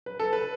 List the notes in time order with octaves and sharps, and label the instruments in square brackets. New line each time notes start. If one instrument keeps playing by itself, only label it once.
[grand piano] B4
A4
B4